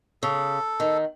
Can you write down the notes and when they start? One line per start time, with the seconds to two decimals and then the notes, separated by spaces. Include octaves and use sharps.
0.23 C#3 A4
0.80 D#3